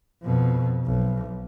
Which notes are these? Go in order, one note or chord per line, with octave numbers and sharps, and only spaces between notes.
F2 B2
B1